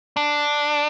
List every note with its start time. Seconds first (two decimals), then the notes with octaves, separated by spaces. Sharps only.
0.17 D4